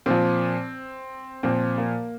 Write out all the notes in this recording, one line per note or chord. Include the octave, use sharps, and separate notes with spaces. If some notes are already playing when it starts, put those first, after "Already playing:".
A#2 F3 C4
A#2 F3 C4
A#3